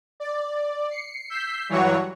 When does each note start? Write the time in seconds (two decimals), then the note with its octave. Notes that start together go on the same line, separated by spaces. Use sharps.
0.20 D5
0.90 C7 C#7
1.30 E6 G6 B6 C7
1.69 G2 E3 F#3 C#5 F#5 C#6